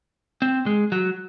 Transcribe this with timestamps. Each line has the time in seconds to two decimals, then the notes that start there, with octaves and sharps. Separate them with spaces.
0.42 C4
0.66 G#3
0.92 F#3